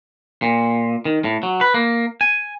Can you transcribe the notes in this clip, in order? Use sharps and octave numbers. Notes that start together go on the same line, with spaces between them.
A#2
D#3
A2
F#3
B4
A#3
G#5